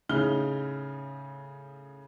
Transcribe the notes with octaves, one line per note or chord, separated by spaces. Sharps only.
A2 C#3 D#4 F6 G7